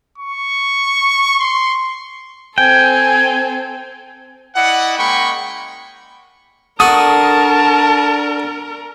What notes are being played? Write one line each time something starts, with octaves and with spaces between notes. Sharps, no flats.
C#6
C6
C4 A4 G5 G#5
E4 D5 D#5 F#5
G#3 A#3 C#4 G5 B5 C#6
D4 F#4 A4 A#4 A5 D#6